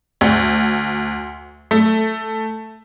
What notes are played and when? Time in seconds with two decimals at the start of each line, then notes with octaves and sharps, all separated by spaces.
0.21 D2
1.71 A3